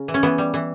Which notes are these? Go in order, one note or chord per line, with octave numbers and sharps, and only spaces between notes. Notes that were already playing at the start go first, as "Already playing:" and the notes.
Already playing: C#3
E3
C#4
E3 B3
G3
E3